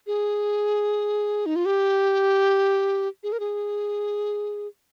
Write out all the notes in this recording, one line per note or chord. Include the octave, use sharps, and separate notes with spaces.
G#4
D#4
F4
G4
G#4
A#4
G#4